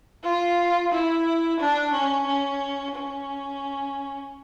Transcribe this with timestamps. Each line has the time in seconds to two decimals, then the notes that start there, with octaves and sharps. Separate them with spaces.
0.23 F4
0.92 E4
1.60 D4
1.93 C#4
2.27 C#4
2.95 C#4